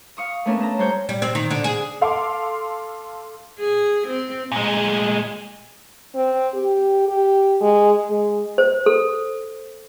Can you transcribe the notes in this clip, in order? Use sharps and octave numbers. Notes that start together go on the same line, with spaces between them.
F5 C#6 D#6
A3 B3 C#4 D4 A#4
A3 D4 A4 A#5
G3 C5 C#5 G6
G3
C4
D#3
D3
G#4
A4 F5 C6 D6
G#4
C4
A#2 G#3
C4
G4
G4
G#3
G#3
C5
A4